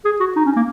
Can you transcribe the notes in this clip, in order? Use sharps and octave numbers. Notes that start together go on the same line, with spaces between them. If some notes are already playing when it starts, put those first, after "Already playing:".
G#4
F#4
D#4
C#4
A#3